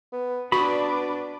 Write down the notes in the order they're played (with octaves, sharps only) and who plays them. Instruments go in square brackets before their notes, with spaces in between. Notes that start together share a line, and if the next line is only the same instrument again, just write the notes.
[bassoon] B3
[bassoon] B3 [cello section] D4 B4 D5 [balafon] F#4 C#6 [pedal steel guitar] B5